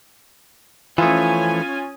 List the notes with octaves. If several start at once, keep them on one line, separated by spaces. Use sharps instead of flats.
E3 F3 A3 C#4 F4 G#5 D#6